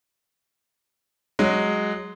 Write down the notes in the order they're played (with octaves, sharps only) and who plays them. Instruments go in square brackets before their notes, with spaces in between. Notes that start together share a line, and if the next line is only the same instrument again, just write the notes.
[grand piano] F#3 G#3